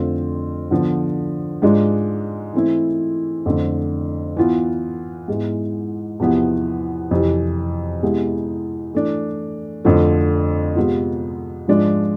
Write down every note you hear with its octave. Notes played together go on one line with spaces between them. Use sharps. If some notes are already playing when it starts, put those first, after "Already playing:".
Already playing: F2 D3 A3 C4 F4
D3 F3 B3
G#2 G#3 D4 F4
E3 A3 C4 E4
F2 D3 A3 C4
E3 B3 F4
G#2 G#3 B3 E4
E2 C3 F3 B3 E4
F2 C3 E3
C3 G#3 B3 E4
E3 A3 D4
F2 D3 F3 A3
C3 G#3 B3 F4
G#2 F3 G#3 D4 F4